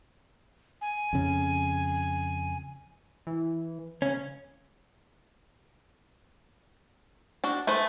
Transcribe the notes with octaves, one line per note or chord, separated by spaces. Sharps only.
G#5
F2 C#3
E3
C#3 C#4
D4 F#4
A3 G#4 B4 C5